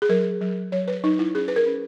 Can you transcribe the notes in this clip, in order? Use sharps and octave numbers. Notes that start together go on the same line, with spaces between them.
G#4
F#3 A#4
F#3
F#3 C#5
B4
F#3 D#4
E4
C#4 G#4
B4
A#4
C#4